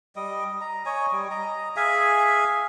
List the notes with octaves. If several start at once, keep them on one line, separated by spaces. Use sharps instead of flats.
G3 D#5
A#5
C#5 D#5 G#5
G3
D#5 A#5
G#4 E5 F5 G#5